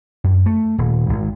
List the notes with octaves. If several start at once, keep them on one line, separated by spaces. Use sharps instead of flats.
F#2
A3
D#1
G#1